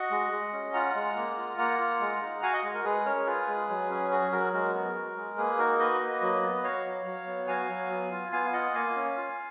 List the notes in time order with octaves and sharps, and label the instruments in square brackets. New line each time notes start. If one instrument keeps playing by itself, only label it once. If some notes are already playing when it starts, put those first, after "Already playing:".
Already playing: [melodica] F#4 D#5 F#5
G#3
G#3
C#4
F4 F#5 A#5
G#3
A#3
F4
A#3 F#5 A#5
F4
G#3
D#4
F#4 F5 G#5
D#5 F#5
G#3
F#4 A#4
G#3 G#4 B4
C#4 A#4 C#5
F4 G#4 B4
G#3
F#3
C#4
F#4 G#4
F#3 F#4 A#4
G#3 F#4 A#4
B3
F#4
G#3
A#3 G#4 B4
D#4 F#4 A#4
F#4 B4 D#5
A#3
F#3
B3
F#4 C#5 F5
F#3
F#3
B3
F#4 F5 G#5
F#3
B3
F4
B3 F5 G#5
F4 D#5 F#5
A#3 F5 G#5
C#4
F4